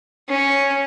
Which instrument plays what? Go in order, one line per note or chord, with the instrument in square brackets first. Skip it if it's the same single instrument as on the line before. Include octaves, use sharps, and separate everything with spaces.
[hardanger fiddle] C#4